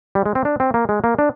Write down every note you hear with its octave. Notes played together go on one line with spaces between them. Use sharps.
G3
G#3
C4
D4
C4
A#3
G#3
A#3
D4